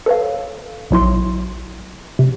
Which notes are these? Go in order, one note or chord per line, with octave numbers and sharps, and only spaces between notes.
A4 B4 C#5 F5
A#1 F#3 E4 C6
C3